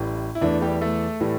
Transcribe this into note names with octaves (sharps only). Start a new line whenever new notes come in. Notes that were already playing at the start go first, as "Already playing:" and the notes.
Already playing: A1 A2 E3 G3
E4
E2 E3 A3 D4
G3 G4
A3 A4
A2 E3 G3